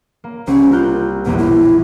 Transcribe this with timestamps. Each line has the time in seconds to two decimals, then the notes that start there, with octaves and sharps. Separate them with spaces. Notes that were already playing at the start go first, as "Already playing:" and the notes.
0.24 A#3
0.47 C2 C4 C#4 C#6
0.72 F4 A#4 F#6 G6
1.25 A#1 E2 B2 A#3
1.38 E4